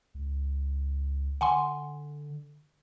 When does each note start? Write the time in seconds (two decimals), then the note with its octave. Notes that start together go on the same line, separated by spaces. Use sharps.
0.15 C#2
1.41 D3 F#5 G#5 C6